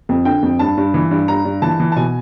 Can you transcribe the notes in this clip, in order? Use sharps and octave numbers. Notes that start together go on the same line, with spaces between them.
F2
D3 G5
F2
G2 A5
G2
E3
G2
G2 A#5
G2
E3 A5
E3
A5
B2 G#5